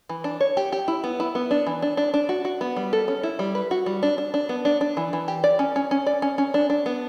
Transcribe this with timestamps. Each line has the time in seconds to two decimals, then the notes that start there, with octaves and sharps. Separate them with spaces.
0.09 E3
0.24 D4
0.41 C#5
0.57 G4
0.72 G4
0.88 E4
1.04 B3
1.20 E4
1.35 B3
1.51 D4
1.67 E3
1.82 D4
1.97 D4
2.14 D4
2.29 F#4
2.45 F#4
2.61 B3
2.76 G3
2.93 A4
3.08 C#4
3.23 E4
3.39 G3
3.55 B4
3.71 F#4
3.86 G3
4.03 D4
4.18 D4
4.34 D4
4.49 B3
4.65 D4
4.81 D4
4.97 E3
5.13 E3
5.28 G4
5.44 D5
5.59 C#4
5.76 C#4
5.91 C#4
6.07 D5
6.22 C#4
6.38 C#4
6.54 D4
6.70 D4
6.86 B3